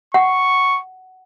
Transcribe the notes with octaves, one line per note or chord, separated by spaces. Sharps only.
F#5 C#6